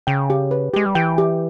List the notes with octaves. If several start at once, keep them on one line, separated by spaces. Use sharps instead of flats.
C#3 G5
G4
B4
G#3 G4
G3
E3 G5
G4